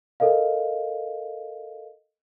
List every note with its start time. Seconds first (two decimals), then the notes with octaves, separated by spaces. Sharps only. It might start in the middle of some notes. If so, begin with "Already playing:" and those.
0.20 A4 A#4 D#5 F5